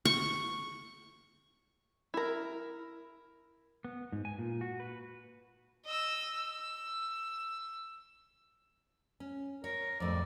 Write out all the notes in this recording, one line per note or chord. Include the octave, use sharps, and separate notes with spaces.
C#6
E4 A#4
B3
G#2
G#5
A#2
F#4
B4
D#5 E6
E6
C#4
A#4 C#5
F2 A2 G3 D5